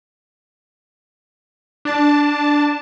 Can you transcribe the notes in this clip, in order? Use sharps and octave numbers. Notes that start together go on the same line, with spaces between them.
D4 A5